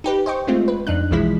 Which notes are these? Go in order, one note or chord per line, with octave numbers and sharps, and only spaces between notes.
D#4 G4 B4
C5 D#5 G5 C#6
G#3 A3 C4 F4
B4
F2 D4 D#4 F#6
B1 E3 F3 G#3 E4 B6